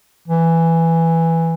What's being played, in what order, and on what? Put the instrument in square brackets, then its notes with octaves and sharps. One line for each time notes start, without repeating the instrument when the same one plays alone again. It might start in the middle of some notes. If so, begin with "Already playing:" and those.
[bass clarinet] E3